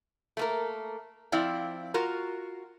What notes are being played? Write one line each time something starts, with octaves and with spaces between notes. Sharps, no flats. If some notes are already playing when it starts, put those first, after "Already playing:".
A3 A#3 A#4
F3 C4 E4 D5 F5
F4 F#4 A#4